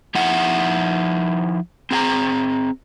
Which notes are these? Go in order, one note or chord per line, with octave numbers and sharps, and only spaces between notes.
F3 D#4 E4 E5 F#5
C4 G#4 G5 A#5